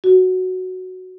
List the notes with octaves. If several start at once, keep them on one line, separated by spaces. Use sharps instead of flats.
F#4